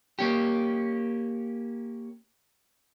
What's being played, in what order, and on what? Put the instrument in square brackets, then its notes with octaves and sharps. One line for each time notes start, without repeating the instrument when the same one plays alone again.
[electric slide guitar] A#3 C#4 G4